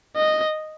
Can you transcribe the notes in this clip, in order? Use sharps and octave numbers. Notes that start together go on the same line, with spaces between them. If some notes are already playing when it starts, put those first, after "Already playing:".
D#5